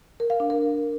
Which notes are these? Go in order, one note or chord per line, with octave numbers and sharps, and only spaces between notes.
A#4
F5
D4
A#4